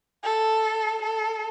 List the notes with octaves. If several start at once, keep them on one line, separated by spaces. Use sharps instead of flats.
A4
A4